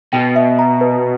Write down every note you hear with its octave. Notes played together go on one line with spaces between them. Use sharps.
B2 G5
E5
A#5
B4